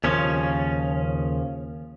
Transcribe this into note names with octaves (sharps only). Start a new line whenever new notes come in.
D#2 C#3 F3 C#4